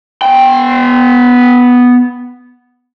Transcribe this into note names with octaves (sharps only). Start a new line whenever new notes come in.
B3 G5